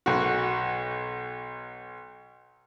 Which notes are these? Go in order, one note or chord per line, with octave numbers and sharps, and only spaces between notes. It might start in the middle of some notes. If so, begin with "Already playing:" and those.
B1 F#4